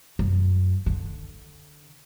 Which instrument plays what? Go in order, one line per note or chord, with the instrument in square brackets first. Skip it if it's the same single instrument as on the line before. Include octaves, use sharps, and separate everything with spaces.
[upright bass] F#2
D3